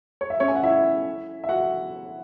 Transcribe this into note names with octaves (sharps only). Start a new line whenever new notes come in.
C#5
E5
C#4 C#5
G#5
F#5
E4 E5
E5
F#4 F#5